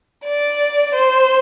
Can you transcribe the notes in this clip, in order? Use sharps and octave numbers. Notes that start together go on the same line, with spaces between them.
D5
C5